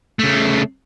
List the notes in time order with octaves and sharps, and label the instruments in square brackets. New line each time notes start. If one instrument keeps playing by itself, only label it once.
[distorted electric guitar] C#3 A3